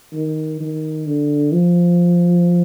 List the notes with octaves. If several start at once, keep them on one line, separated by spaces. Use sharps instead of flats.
D#3
D#3
D3
F3